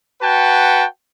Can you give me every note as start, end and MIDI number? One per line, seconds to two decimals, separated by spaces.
0.22 0.85 66
0.22 0.85 71
0.22 0.85 78
0.22 0.85 79
0.22 0.85 81